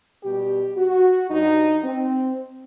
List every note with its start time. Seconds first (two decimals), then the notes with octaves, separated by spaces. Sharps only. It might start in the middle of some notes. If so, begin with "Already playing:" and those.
0.24 B2 G3 G4
0.77 F#4
1.31 G2 F#3 D#4
1.84 C4